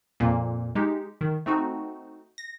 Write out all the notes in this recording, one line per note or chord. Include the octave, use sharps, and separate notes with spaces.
F2 A#2 A#3
G#3 D#4 G4
D#3
A3 C4 D#4 F#4
A#6